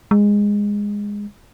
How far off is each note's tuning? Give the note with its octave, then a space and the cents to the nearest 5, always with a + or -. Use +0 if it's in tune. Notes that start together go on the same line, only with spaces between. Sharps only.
G#3 -15